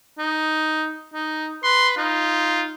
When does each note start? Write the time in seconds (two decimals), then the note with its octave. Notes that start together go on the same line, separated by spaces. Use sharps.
0.18 D#4
1.14 D#4
1.64 B4 C6
1.97 D#4 F4